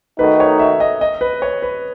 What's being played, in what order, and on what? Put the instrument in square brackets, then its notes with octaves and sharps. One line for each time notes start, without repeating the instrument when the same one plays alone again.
[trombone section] D#3 A3 D#4 F#4 [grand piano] B4
[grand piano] C#5
E5
D#5
D#5
B4
C#5
B4